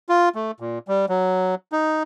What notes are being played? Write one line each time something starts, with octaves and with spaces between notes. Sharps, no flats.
F4
A3
A#2
G3
F#3
D#4